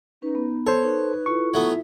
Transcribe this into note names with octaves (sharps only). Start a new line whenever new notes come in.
C#4 D#4 B4
B3
A4 C5 C#5
D#4 B4
E4 F4 A4 C#6
F#3 A3 B3 E5